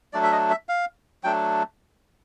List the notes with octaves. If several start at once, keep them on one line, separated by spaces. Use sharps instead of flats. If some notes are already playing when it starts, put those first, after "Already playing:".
F#3 A3 D4 D5
E5
D#5
E5
F5
F#3 A3 D4 G5